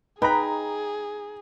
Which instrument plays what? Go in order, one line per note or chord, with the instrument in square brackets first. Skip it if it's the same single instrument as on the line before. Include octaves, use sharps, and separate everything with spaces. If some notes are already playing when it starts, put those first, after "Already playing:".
[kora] D#4 [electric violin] G#4 [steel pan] B4 [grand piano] G5 A#5